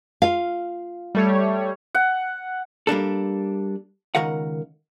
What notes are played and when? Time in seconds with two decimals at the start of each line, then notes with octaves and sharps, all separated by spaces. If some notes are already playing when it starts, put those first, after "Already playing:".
0.22 F4 F5
1.15 G3 A3 C#5
1.95 F#5
2.87 G3 A#3 D4 A4
4.15 C#2 D#3 A#4 F5 F#5